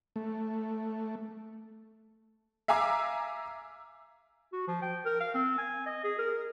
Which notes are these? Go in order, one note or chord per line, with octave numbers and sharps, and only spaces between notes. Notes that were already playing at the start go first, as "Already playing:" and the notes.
A3
E5 F5 G#5 A#5 D6 E6
F#4
F3
G5
A#4
F5
C4
G#5
D#5
G#4
A#4